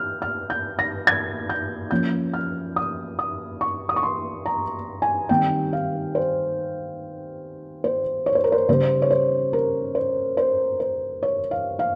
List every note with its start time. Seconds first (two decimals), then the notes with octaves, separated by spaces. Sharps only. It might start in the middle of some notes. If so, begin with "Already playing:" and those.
Already playing: F6 G6
0.22 F6
0.50 G6
0.79 A#6
1.07 G#6
1.49 G6
1.91 F3 A#3 C#4 G6
2.34 F6
2.76 D#6
3.19 D#6
3.61 C#6
3.89 D#6
3.96 C#6
4.03 C6
4.46 A#5
5.02 G#5
5.29 D#3 G3 C4 G5
5.73 F5
6.15 C5
7.84 C5
8.26 C#5
8.35 C5
8.44 A#4
8.52 C5
8.69 C#3 G3 C#4 C5
9.02 C#5
9.10 C5
9.53 A#4
9.95 C5
10.37 C5
10.80 C5
11.23 C#5
11.51 F5
11.79 F5